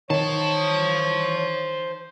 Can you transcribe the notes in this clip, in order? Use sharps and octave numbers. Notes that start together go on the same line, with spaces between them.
D#3 C5 C#5 A5